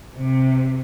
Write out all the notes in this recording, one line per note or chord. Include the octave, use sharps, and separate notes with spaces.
C3